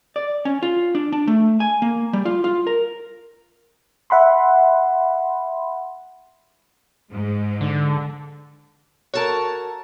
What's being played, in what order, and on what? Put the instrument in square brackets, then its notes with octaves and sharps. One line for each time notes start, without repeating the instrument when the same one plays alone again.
[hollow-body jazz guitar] D5
C#4
F4
D4
D4
A3
G#5
A#3
G3
F4
F4
A#4
[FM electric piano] E5 F#5 B5 C6
[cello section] G#2
[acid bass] D3
[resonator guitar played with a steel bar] F#4 A4 A#4 [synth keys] C#5 A5